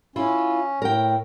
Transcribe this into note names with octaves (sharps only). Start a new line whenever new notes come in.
C#4 E4 F4
A2 A#4 G5